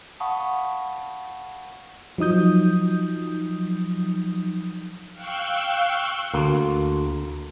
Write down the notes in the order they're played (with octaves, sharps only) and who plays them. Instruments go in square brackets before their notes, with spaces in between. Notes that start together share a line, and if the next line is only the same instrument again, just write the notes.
[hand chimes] F5 F#5 A5 B5 C#6 D#6
[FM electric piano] F3 F#3 D#4 D#6 G6
[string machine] F5 G5 C#6 E6 F#6 G6
[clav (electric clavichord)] D2 A#3